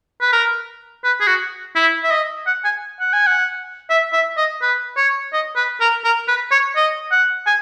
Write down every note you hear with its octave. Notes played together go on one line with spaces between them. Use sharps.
B4
A#4
B4
G#4
F#4
E4
E5
D#5
F#5
G#5
F#5
G#5
F#5
E5
E5
D#5
B4
C#5
D#5
B4
A#4
A#4
B4
C#5
D#5
F#5
G#5